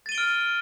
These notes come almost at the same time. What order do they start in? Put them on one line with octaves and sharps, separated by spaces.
A6 D#7 G7 D7 F6